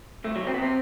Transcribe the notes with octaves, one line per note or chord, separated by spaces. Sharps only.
C2 A3
F#3
C2
C4
B3
C3 C4